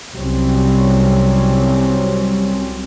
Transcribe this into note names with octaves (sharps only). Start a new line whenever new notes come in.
C2 C3 F#3 G3 C4 C#4